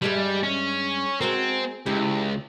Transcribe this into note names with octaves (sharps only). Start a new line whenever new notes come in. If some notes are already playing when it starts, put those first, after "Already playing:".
G2 G3 G#3 E5
C#4
G#3 C4 F#4 A#4
C#2 E4 G4